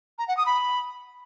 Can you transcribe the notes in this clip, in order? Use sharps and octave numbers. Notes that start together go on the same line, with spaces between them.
A#5
F#5
D#6
B5